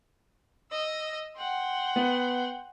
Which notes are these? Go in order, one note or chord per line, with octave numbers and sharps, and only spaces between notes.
D#5 E6
F#5 G5 C6
B3